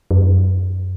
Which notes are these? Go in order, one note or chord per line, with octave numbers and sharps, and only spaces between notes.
F#2